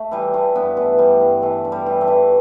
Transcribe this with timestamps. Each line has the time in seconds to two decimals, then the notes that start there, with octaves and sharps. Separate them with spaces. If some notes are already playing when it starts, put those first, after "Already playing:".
Already playing: A3
0.11 E3 G3
0.34 E3 A3
0.55 G2 B3
0.77 E3 A3
0.99 G2 G3
1.21 G2
1.42 E3 A3
1.65 G2
1.72 G3
1.86 E3
2.01 A3
2.08 E3